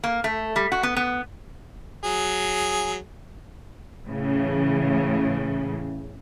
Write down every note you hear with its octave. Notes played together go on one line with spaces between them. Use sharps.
A#3
A3
G3
F#4
B3
B3
F#3 G#4
A2 C#3 E3